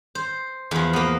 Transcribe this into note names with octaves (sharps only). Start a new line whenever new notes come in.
C5
E2 F3
A#3 B3